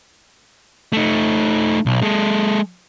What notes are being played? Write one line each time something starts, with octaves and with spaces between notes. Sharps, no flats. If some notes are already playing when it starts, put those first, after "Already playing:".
A3 D#4
B1
G#3 A4